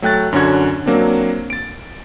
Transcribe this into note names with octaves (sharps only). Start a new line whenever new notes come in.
F#3 A3 G5 F#6 A6
F#2 D3 C#4 D4 F#4 G#6
F#3 A#3 C4 D4
A6 D7